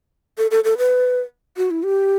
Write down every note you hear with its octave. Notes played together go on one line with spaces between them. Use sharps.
A4
A4
A4
B4
F#4
E4
G4